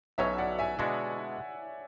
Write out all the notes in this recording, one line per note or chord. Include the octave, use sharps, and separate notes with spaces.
B1 B2 F#3 C#4 C#5 E5
D5 F#5
E5 G#5
B2 G#3 D4 F#4 D5 F#5